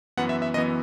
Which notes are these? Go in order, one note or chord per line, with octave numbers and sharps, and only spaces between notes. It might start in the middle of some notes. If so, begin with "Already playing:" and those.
F#2 E3 B3 F#5
E5
E5
F#2 E3 B3 D#5